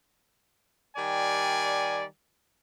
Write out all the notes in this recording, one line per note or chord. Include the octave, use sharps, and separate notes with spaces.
D#3 G3 D5 G#5